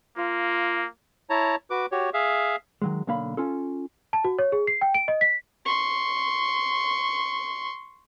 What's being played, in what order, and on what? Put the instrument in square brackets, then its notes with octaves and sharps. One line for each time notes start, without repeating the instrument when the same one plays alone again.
[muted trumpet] A#3 [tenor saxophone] F4
[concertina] E4 C#5 A5 A#5
F#4 B4 D6
F#4 G4 C#5
G#4 E5 F5
[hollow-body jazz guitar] D#3 F#3 G#3
B1 D3 A#3 F5 B5
C#4 F4 A4
[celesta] A5
F#4
C#5
G#4
C7
G5
D7
D#5
B6
[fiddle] C6 C#6